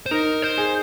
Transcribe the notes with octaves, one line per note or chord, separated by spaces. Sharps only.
C5
D#4 A#4
C5
G#4